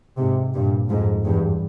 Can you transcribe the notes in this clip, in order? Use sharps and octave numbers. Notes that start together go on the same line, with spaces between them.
G#2 C3
G2 A#2
F2 G#2
E2 G2